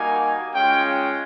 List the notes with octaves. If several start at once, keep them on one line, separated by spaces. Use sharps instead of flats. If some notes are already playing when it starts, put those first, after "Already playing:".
Already playing: G3 A#3 D#4 F#4 G#5
G#3 C#4 F4 G5